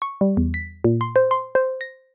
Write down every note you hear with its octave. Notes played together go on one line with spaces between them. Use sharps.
C#6
G3
E2
B6
A#2
C6
C5
C6
C5
A#6